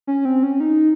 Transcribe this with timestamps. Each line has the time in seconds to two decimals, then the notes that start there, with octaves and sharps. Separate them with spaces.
0.07 C#4
0.25 C4
0.43 C#4
0.60 D#4